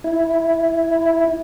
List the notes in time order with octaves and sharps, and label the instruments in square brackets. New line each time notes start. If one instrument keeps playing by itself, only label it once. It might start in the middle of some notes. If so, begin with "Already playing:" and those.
[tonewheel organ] E4